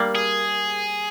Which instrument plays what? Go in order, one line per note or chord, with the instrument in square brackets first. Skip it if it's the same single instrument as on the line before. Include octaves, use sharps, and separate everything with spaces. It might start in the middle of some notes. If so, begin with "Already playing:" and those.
Already playing: [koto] G3 A#3
[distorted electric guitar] G#4